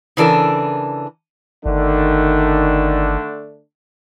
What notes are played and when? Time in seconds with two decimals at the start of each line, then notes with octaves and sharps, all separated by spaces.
0.17 C#3 E3 D4 A4 A#4
1.66 G1 D3 D#3 A3 D4